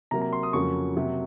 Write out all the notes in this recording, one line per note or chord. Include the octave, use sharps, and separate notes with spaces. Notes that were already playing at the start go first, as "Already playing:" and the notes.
C3 F#3 A#3 A#5
A#5
C6
D#6
F2 C#3 F#3 A#3 C#6
C3 F#3 A#3